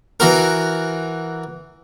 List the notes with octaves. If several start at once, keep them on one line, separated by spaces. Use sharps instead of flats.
E3 F#4 A#4